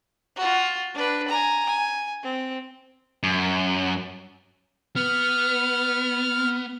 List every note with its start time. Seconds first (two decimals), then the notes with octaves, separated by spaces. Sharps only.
0.36 F4 F#4
0.94 D4 B4
1.28 G#5 A#5
1.66 G#5
2.23 C4
3.23 F#2
4.96 B3 F6